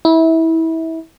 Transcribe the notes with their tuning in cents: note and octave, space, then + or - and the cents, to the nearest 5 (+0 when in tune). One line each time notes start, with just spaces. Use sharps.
E4 -25